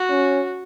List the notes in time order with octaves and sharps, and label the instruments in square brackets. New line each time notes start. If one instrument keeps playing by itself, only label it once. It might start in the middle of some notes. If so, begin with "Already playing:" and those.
Already playing: [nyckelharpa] F#4
[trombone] C#4